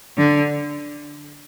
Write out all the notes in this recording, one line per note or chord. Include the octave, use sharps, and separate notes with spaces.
D3